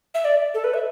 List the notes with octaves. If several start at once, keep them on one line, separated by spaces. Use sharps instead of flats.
E5
D5
A4
B4
E5